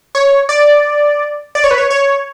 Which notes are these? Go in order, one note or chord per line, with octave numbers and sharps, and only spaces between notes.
C#5
D5
D5
C#5
B4
C#5
C#5